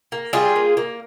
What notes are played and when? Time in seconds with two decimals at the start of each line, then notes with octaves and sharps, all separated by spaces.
0.12 A#3
0.33 G3 F4 G#4
0.56 A#3
0.77 A#3